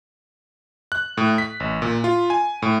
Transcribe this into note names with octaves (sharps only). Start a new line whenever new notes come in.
F#6
A2
B6
A1
A#2
F4
G#5
A2